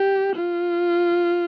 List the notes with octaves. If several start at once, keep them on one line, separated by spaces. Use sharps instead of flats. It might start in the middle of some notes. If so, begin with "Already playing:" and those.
Already playing: G4
F4